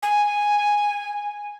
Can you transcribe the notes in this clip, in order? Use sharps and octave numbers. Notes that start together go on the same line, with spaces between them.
G#5